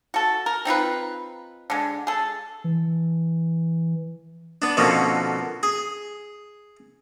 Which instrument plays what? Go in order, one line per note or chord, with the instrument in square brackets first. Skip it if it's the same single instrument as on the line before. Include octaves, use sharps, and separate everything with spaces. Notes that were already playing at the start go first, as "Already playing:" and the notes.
[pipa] F#4 A4
A#4
C4 D#4 F4 B4
D3 G#3
G#4 A4
[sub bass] E3
[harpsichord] B3 D4
F2 B2 D3 A#3 C#4
G#4